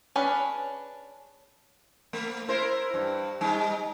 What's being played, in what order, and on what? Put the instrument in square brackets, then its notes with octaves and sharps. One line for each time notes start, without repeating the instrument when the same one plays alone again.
[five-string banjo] C#4 D4 G#4 B4
[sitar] A3
E4 A#4 C5
G2
G3 D#4